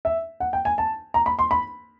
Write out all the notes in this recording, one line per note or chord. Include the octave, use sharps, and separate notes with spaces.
E5
F#5
G5
G#5
A5
A#5
B5
C6
B5